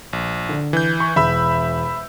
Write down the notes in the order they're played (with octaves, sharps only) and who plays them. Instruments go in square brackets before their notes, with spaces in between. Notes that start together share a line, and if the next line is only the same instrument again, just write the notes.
[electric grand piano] A#1
[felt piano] D3
[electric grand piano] E3 G6
[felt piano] C#6
[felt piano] E1 [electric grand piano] E5 B5 E6